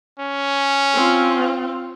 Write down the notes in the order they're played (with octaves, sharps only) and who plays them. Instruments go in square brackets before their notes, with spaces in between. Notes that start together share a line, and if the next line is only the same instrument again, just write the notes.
[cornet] C#4
[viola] C4 F4